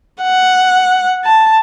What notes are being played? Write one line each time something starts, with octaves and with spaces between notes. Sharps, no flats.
F#5
A5